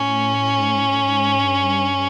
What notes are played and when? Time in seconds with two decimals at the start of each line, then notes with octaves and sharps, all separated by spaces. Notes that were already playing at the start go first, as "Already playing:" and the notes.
Already playing: A2 C#4
0.60 G#2
0.68 A2
0.75 G#2
0.82 A2
0.88 G#2
0.95 A2
1.03 G#2
1.44 G2